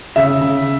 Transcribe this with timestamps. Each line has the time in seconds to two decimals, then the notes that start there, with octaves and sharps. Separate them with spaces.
0.16 C#3 E5
0.41 C#3